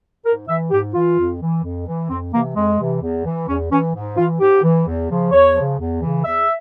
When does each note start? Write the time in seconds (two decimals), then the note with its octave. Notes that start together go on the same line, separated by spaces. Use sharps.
0.25 G#2 A#4
0.48 E3 E5
0.71 G#2 G4
0.94 E3 F4
1.17 F2
1.40 E3
1.63 F2
1.86 E3
2.09 F2 C4
2.32 C3 E3 A#3
2.55 F2 G#3
2.78 C3 E3
3.01 E2
3.24 E3
3.47 E2 C#4
3.70 E3 C#4
3.93 G#2
4.17 E3 F4
4.39 G#2 G4
4.63 E3
4.86 E2
5.09 C#3 F3
5.31 E2 C#5
5.55 C#3 F3
5.78 E2
6.01 C#3 E3
6.24 E2 E5